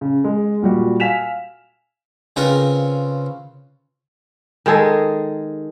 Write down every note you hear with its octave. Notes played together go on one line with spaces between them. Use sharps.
C#3
G#3
A#2 G3 F#4
F5 G#5 B6 E7 F7
C#3 C4 C#4 F4 A#4 B4
D#3 G#3 G#4 A4